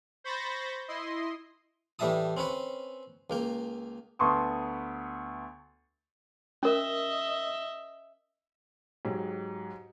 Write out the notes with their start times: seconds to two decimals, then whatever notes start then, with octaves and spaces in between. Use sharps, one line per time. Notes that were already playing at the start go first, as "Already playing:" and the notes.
0.24 C5 B5 C#6 G6 A6 A#6
0.88 E4 D#5 C6
1.99 A2 E3 G3 E5 A5 D#6
2.37 C4 C#4 B4 C#5
3.30 C#2 A#3 G5
4.19 D2 B3 A5 C6 C#6 D#6
6.63 C#4 A#4 D#5 E5
9.05 G#2 F#3 G4